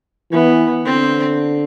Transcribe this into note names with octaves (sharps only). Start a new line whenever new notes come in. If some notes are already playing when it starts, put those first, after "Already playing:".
E3 B3
D3 C4